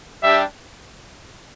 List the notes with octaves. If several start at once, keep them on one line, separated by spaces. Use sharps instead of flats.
G3 D4 G4 E5